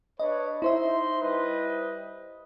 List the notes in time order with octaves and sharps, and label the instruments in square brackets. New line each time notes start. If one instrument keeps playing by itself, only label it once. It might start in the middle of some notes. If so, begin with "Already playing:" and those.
[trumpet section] D4 B4 C#5 [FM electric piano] D#5
[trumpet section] D#4 C6 [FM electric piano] E4 C5 E5
[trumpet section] G3 B4 D#5